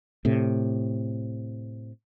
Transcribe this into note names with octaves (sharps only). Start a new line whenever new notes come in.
A2 C3